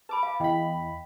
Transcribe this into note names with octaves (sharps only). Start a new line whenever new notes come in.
B4 A5 B5 D6
F5
E2 D#5 G5 B5